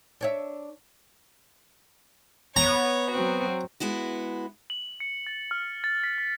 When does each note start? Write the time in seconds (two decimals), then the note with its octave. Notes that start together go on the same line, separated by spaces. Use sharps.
0.21 D4 C#5 E5
2.56 B3 C#5 A#5
3.13 F#3 C4 F#4
3.80 G#3 B3 E4 F#4
4.70 F#7
5.00 C#7
5.27 A6
5.51 F6
5.84 A6
6.04 B6
6.18 B6